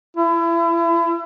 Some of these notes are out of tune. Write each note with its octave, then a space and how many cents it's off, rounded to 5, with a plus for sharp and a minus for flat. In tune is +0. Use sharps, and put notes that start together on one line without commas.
E4 +35